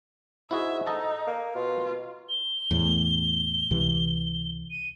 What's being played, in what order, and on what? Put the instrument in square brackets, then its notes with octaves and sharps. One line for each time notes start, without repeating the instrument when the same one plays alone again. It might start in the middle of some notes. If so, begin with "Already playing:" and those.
[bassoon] G#2 [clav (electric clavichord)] E4 F#4 G#4 [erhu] E5
[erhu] D#4 [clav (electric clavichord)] A4 D#5 A5
[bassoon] A#3
[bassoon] B2 [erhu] F4
[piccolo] G7
[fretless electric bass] E2 A2
C#2 C3 E3
[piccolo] D#7